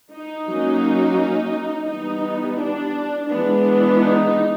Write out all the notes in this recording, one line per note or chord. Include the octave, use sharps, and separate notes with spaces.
D#4
F#3 A#3 C#4
E3 G3 B3 D#4
D4
E3 G#3 B3 D4
D#4